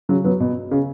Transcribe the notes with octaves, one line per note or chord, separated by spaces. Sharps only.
C#3 F#3
F#3 B3
B2
C#3